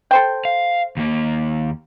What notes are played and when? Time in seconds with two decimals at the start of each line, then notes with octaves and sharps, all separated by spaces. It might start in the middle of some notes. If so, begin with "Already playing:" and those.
0.11 A4 C5 G5
0.45 F5
0.97 D#2 A#3